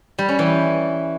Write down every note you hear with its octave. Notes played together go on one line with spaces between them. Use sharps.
G3
C#4
E3